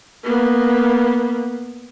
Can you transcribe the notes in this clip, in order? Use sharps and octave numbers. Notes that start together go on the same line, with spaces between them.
A#3 B3